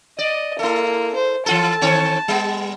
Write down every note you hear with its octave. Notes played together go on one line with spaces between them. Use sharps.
D5 D#5
A#3 E4 A4
C5
E3 F4 A4 A5
D#3 C4 C#5
G3 B3